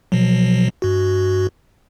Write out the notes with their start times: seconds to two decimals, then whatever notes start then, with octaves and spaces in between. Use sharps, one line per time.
0.12 B2 F3 F#3
0.82 G2 F#4